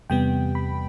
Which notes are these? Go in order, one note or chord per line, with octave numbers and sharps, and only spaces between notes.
E2 C3 G3 B3 G5
B5